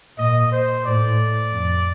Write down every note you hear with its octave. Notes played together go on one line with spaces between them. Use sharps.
A#2 D#5
C5
A2 D5
F2